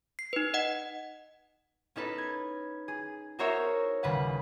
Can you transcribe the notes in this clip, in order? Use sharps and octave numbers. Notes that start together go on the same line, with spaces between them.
C7
D#4 B4
D#5 F#5
C#4 D#4 A4 B4
G#6
G#4
D#4 F#4 A#4 C5 C#5 E5
D#1 C#3 B4 F#5